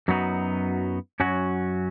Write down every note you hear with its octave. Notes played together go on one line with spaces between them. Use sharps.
F#2 F#3 B3 D#4 F#4
F#2 F#3 C#4 F#4